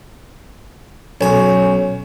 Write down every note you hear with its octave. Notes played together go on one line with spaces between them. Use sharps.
B1 C#4 G#5